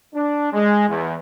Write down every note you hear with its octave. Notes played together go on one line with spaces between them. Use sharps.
D4
G#3
E2